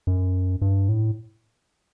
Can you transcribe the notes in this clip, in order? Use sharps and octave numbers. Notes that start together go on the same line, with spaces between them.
F#2
G2
A2